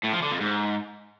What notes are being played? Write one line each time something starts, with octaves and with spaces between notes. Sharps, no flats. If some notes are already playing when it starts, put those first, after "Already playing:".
A2
F3
D3
F2
G#2